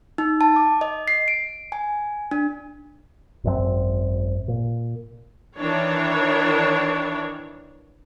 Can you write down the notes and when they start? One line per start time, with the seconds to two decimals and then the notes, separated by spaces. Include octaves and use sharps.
0.18 D#4
0.41 A5
0.56 D6
0.81 D#5
1.08 C7
1.28 D7
1.72 G#5
2.31 D4
3.44 G#1 F#2 B2 C4
4.48 A#2
5.57 D#3 E3 D4 C#5